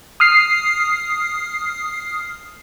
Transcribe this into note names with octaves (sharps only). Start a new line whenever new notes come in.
D#6 F6 C7